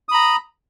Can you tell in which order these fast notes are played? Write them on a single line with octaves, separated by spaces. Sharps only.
D#6 B5 A#5